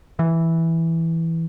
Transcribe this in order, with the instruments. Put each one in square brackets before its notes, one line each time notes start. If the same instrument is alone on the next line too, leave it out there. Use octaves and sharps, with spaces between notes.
[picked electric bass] E3